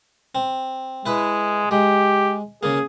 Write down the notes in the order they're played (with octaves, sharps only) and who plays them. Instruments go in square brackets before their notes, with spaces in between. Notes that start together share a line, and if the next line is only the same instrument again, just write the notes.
[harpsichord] C4
[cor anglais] G#3 [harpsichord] E4 B4
[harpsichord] G#3 [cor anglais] G4
[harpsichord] C#3 A#3 [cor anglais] G#4